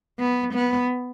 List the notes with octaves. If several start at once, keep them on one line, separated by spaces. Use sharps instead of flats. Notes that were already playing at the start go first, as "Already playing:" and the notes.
B3
B3